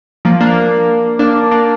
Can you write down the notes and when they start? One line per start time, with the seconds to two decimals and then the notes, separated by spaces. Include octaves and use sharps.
0.25 F3 A#3
0.41 A#3 D4
1.19 A#3 D4
1.51 A#3 D4